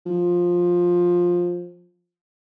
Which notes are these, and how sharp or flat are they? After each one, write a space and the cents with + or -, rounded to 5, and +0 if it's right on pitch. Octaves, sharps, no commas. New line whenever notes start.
F3 +10